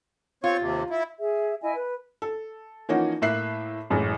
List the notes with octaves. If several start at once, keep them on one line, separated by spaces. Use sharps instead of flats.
C4 F4 C#5 C#6
D#2 C3
E4
G#4 E5
E4 D#5 G#5
B4
A4
E3 F3 A#3 C#4 D#4 F#4
A2 A#3 E5 F#6 C7
A1 F#2 A2 E3 G#3